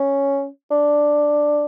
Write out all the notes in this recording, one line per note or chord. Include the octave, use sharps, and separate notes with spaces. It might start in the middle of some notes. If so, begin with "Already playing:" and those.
Already playing: C#4
D4